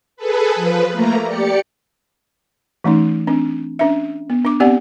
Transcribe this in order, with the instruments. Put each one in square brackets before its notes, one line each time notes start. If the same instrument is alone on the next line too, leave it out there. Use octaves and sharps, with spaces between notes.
[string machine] G#4 A4 B4
F3 B4
A3 A#3 A#5
G4 D5 C#7
[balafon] E3 A3 C#4 D#4
C4 D4
C#4 D4 E5
B3
D4 D6
B3 C4 G4 D5 F#5